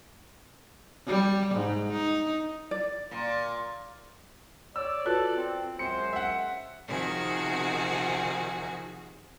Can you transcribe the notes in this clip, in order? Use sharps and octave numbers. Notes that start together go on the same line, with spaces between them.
G3
G#2
D#4
D5
A#2
C#5 D5 E6
F4 F#4 A4 B4 F#6
C4
F#2 G#3 C5 C#7
E5 F#5
C3 D#3 F3 F#4 G#4